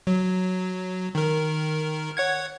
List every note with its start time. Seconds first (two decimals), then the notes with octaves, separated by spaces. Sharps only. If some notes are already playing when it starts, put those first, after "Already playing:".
0.07 F#3
1.15 D#3 A#4
2.17 C#5 F#5 G#6